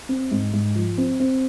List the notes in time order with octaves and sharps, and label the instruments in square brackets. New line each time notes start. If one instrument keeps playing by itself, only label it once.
[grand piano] C4
G#2
G#2
F3
C4
C4